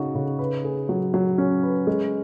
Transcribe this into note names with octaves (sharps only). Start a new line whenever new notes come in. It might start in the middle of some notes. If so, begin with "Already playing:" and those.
Already playing: C#3 D#4 F#4
C#3
B4
G#4
F#3
F#3
C#4
B4
G#3